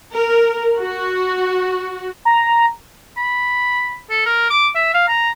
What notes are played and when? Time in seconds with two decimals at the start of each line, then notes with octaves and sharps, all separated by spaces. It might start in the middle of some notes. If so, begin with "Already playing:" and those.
0.15 A#4
0.78 F#4
2.25 A#5
3.17 B5
4.10 A4
4.26 A#4
4.50 D6
4.75 E5
4.94 F5
5.08 A#5